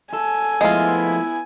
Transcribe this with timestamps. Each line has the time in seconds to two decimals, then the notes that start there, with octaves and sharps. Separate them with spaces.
0.13 A4 G#5
0.61 F3 G#3 A3 B3 E4 F4